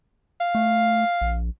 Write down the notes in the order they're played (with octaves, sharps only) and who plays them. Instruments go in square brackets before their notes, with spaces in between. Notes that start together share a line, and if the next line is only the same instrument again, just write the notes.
[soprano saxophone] F5
[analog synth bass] A3
A#1